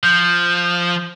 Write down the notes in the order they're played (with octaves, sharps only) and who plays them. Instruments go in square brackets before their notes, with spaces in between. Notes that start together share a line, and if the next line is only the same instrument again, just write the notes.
[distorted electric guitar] F3 [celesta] G6